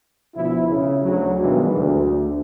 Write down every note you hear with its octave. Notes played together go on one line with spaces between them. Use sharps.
D2 B2 F3 E4
C#3
D2 F#3
G2 B2 D#3 E3 G#3
D2